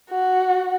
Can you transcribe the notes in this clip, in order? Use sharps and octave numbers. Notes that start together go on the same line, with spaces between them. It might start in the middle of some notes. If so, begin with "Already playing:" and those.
F#4